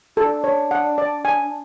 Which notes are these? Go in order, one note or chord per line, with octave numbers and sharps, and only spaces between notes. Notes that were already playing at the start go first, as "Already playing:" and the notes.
D4 F#4 A4
C#5
F#5
D5
G#5